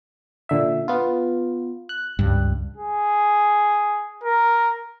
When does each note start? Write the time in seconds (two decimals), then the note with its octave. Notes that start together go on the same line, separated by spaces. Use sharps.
0.49 A#2 D3 E5
0.88 B3 F4
1.89 F#6
2.19 C#2 G2
2.77 G#4
4.24 A#4